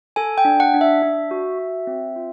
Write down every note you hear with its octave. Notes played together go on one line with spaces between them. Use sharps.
A4 G#5
G5
D4
F#5
D4
E5
D4
F#4
F#4
C4
F4